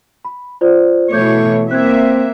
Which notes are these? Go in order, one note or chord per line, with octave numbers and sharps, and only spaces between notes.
B5
F4 C5 D5
B2 E3 A3 C#5 D6 G6 G#6
A#3 C4 E5 F#6 G#6